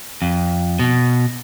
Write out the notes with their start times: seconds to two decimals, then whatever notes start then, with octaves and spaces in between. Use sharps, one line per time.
0.22 F2
0.79 B2